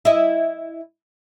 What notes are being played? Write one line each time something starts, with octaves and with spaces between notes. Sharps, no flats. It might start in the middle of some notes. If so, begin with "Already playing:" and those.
E4 D#5 E5